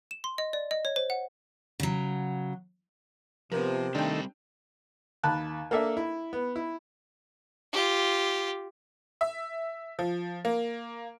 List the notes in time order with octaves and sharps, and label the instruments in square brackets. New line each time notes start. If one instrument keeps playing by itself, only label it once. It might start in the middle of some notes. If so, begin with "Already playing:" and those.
[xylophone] E7
C6
D#5
D5
D#5
C#5
C5
F#5
[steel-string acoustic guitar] C#3 F#3
[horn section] C3 [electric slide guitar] F3 [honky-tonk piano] B3 A#4
[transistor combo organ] D#3 A3 [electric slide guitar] G3 C4 C5 [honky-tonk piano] D4 G5
[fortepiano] D#2 A5 B5 F#6
A#3 D4 A4 E5
E4
B3
E4
[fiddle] F4 G4
[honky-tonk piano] E5
F3
A#3